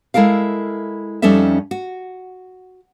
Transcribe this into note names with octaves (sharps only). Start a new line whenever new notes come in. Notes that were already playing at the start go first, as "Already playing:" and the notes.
G#3 E4 A4 A#4 F5
F2 G3 C#4 D#4 A4 E5
F#4